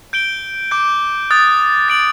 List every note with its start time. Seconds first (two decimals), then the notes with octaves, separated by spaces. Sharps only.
0.13 G6 D7 G7
0.71 D6 G6 D7
1.30 D#6 F#6 A6
1.88 A6 D7 F#7